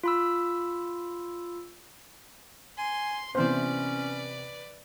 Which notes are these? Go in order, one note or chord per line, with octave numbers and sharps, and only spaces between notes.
F4 B5 E6
G#5 C6
C3 E3 B3 C#4 B4 C5 D5